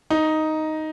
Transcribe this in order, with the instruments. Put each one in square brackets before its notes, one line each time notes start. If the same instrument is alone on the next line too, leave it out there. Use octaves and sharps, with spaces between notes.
[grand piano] D#4